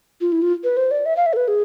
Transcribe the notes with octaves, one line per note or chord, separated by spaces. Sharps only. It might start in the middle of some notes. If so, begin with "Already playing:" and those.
F4
E4
F4
B4
C5
D5
E5
F5
E5
A4
B4
G#4